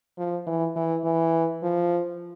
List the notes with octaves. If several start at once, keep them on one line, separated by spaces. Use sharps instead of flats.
F3
E3
E3
E3
F3